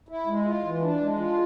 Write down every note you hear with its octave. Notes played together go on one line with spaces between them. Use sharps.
E4
G#3
F4
E3
D4
G#3
F4